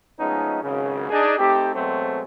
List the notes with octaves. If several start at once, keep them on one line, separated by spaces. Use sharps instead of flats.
F3 G#3 A3 B3 C#4 D#4
G#1 C#2 F#2 C#3
D4 D#4 G#4
A3 C4 D#4 G4
B2 F#3 G#3 A3 C4